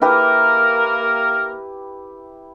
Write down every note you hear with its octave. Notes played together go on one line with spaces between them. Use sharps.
A#3 E4 G4 A#4 B4